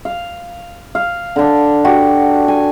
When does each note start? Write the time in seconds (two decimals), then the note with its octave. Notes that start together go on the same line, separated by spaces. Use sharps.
0.05 F5
0.95 F5
1.36 D3 D4
1.85 F#4 G4
2.48 G#5